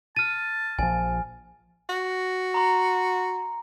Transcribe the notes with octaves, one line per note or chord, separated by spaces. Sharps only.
A5 F6 A6 D#7
A#1 F3 G#5
F#4
A#5 C6